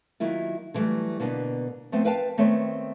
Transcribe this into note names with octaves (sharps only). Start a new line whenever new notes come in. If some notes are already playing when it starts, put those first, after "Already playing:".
D#3 F#3 A#3 E4 F4
D3 E3 F#3 G3 A3
B2 D3 A#3 B3 D4
F3 A3 B3 C4
A#4 B4 F5 G5 A5
D#3 A3 B3 C4 C#5